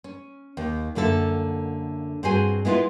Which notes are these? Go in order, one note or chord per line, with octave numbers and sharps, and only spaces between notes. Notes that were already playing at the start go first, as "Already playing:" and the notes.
C#4
D#2
F#2 D3 A#3 A4 E5
G2 C4 F#4 G#4 C5 G#5
G#3 B3 E4 F4 B4